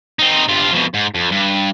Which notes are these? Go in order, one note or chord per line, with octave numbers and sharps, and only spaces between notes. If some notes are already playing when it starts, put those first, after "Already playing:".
C4 D#4
G2 F4
F2 B2
G#2
F2
G2